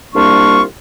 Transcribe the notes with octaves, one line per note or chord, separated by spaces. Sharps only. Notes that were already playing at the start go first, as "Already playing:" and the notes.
C2 G3 A#3 D4 F4 C#6